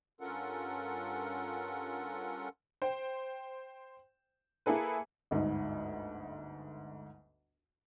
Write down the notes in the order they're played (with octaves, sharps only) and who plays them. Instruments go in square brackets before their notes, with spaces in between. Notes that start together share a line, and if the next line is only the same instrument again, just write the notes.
[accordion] G2 C#4 F4 A4 A#4 F#5
[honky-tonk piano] C5 G5
A#3 E4 G#4 A4 B4
[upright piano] G1 D2 G#2 D#5